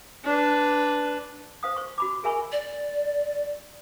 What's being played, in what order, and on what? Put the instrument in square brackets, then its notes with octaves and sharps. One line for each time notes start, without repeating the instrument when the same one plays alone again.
[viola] D4 B4
[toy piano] C5 F5 D#6
C5 C#6
F#4 B5 D6
G#4 A#4 E5 G#5 B5 C#6
[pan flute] D5